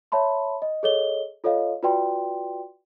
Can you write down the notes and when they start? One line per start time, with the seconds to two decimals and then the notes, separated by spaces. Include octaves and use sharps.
0.12 C#5 E5 A5 B5 C6
0.62 D#5
0.83 G#4 A4 C#5 D#5 G7
1.44 F4 A4 C#5 D#5 F5
1.83 F4 F#4 B4 D5 G5 C6